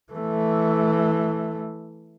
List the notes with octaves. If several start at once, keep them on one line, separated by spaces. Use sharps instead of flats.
E3 A3